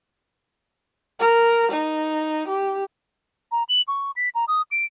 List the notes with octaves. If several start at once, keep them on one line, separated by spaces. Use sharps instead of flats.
A#4
D#4
G4
A#5
F#7
C#6
B6
A#5
D#6
D7